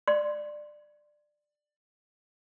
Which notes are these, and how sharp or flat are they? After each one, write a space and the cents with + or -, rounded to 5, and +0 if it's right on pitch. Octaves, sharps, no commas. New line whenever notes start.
D5 +15 C6 +0